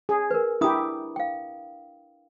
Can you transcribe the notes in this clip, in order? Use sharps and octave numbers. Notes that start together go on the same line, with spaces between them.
G#4
A#4 B4
D4 E4 G4 A#5 D#6
F5 G5